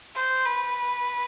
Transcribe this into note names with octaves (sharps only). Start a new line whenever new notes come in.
C5
B4